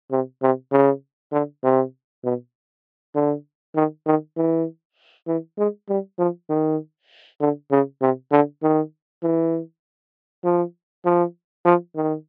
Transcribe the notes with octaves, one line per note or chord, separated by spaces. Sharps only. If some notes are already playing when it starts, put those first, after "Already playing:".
C3
C3
C#3
D3
C3
B2
D3
D#3
D#3
E3
E3
G#3
G3
F3
D#3
D3
C#3
C3
D3
D#3
E3
F3
F3
F3
D#3